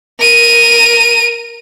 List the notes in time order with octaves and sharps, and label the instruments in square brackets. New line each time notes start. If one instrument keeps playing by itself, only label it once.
[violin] A#4 D#7